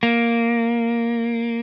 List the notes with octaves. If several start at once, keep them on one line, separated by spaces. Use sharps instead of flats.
A#3